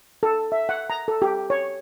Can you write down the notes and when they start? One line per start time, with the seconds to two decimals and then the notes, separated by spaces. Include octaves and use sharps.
0.23 A4
0.52 E5
0.69 F#5
0.90 A#5
1.08 A4
1.22 G4
1.50 C#5